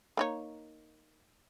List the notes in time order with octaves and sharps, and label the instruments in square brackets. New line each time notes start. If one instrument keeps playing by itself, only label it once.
[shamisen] A#3 D#4 C#5